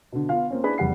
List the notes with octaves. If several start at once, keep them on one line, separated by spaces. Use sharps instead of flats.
B2 D3
B3 F4 F5
A#3 C4 C#4
D4 E4 G#4 B4 D5 B5
F1 E2 G3 F#5 C7